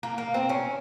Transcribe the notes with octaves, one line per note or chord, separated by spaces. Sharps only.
A#3
A#3
C4
C#4